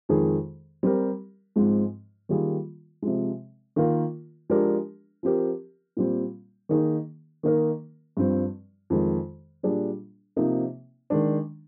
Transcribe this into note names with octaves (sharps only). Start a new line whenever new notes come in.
F2 D#3 G#3 D#4 G#4
G3 C4 G4 A#4
G#2 F3 G#3 C4
D#3 G3 A#3 F4 G#4
C3 F3 G#3
D#3 A#3 F4 A#4
F3 G#3 D4 G4 A#4
F3 C4 G4 A#4
A#2 G3 C4
D#3 A#3 D#4 G#4
D#3 A#3 D#4 A#4
G2 F3 C4
F2 D#3 G#3
A#2 G3 D4 G#4
C3 F3 A#3 D#4
D#3 G#3 D4